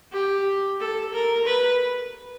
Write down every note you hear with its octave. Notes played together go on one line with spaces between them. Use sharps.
G4
A4
A#4
B4